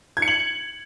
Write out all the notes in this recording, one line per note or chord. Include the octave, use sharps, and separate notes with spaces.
G#6
C#7
F#7